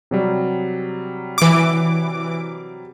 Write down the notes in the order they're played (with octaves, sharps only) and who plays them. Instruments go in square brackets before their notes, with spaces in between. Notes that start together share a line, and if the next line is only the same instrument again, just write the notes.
[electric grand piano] C3 F#3 G3
[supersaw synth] E3 D6